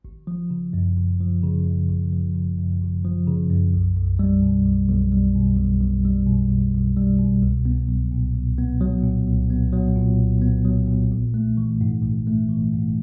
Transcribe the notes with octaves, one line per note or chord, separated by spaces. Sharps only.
G#1
F3
C#3
F#2
G#1
F3
C#3
F#2
G#1
F3
C#3
F#2
G#1
F3
C#3
F#2
B1
B1
G3
B2
B1
B1
G3
B2
B1
B1
G3
B2
B1
B1
G3
B2
C2
B3
F#3
A#2
C2
B3
F#3
A#2
C2
B3
F#3
A#2
C2
B3
F#3
A#2
A#1
A3
E3
G#2
A#1
A3
E3
G#2